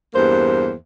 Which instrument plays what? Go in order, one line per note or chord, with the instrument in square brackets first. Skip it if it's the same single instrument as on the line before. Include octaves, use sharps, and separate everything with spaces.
[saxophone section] E2 G2 A#3 C5